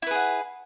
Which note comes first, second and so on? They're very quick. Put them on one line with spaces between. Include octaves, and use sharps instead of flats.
E4 B4 G#4 F#5